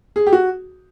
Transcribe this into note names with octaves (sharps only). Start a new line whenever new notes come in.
G#4
G4
F#4